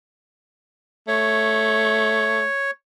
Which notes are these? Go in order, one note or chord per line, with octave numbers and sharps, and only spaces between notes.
A3 C#5